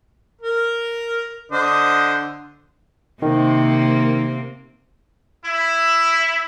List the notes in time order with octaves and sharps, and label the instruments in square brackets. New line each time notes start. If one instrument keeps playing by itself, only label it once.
[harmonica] A#4
D3 C5 D#5
[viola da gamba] C3 A#3 C4 [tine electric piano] D#3
[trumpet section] E4